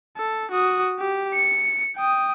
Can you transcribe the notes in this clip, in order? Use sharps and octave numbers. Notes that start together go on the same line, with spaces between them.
A4
F#4 D#6
G4
C#7
G5 D#6